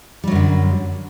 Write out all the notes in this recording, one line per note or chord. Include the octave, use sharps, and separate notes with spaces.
F#2 D3 F#3 G3